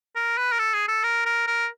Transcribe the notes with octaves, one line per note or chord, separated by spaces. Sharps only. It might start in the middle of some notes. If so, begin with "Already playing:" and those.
A#4
B4
A#4
A4
G#4
A4
A#4
A#4
A#4